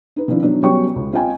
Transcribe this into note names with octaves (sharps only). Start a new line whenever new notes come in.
D#4 B4
D#3 F3 C4 D4 E4
D#3 F#3 B3 D4 D#4
F#3 G3 B3 C#4 G5 C#6
C#2
C4 F4 D#5 G5 G#5